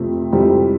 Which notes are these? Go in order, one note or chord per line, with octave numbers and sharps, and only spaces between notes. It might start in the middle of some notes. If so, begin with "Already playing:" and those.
Already playing: F2 C3 F3 A3
F2 C3 E3 G3